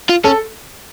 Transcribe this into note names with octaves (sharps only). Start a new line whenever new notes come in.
F4
C#4 A4